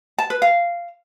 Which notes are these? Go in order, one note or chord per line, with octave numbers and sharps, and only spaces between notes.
A5
B4
F5